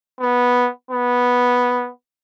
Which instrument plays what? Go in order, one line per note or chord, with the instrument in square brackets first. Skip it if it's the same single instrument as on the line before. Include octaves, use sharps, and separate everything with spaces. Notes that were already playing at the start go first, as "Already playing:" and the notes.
[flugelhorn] B3
B3